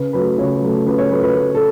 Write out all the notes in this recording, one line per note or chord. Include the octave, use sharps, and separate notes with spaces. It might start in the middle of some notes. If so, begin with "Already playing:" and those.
Already playing: C#3 B4
F#3 A3 B4
C#3 C#5
F#3 A3
C#3 B4
C#5
F#3 A3 B4
B4
C#3 B4
A4